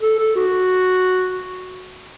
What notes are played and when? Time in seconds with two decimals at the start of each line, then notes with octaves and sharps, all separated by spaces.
0.01 A4
0.19 A4
0.36 F#4